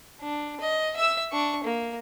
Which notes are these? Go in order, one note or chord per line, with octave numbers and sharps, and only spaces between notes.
D4
D#5
E5 E6
D4 C#6
A#3